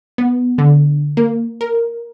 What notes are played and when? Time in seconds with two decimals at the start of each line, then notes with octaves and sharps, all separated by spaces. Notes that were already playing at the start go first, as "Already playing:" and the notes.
0.18 B3
0.58 D3
1.17 A#3
1.61 A#4